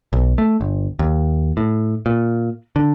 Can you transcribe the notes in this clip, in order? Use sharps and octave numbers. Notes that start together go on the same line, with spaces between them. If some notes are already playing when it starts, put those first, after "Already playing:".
B1
A3
G1
D#2
A2
A#2
D3